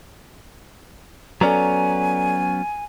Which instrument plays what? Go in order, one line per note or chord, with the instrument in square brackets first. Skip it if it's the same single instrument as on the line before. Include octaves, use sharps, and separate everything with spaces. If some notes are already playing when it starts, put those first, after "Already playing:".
[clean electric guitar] F#3 B3 C#4 [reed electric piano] A4 D5 A#5 [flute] G#5